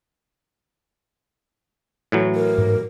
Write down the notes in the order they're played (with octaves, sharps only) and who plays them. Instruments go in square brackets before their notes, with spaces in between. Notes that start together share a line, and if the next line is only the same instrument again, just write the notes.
[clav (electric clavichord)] A2 E3 F#3
[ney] A#4
[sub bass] G#2